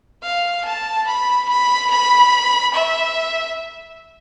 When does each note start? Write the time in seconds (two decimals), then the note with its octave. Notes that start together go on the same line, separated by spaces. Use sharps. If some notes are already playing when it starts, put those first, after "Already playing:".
0.23 F5
0.65 A5
1.07 B5
1.49 B5
1.91 B5
2.74 E5